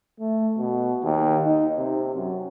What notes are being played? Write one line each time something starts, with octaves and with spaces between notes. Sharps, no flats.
A3
B2
D#2
D#4
C3
F#2